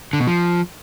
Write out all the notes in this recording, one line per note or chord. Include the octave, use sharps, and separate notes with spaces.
D3
B2
F3